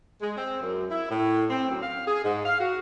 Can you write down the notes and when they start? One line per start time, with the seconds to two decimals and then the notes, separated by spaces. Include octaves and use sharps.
0.21 G#3
0.37 C4
0.61 F#2
0.90 E4
1.10 A2
1.49 C4
1.68 F#2
1.82 F5
2.07 G#4
2.24 G#2
2.45 F5
2.59 F#4